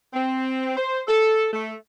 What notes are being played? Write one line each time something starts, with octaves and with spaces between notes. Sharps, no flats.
C4
C5
A4
A3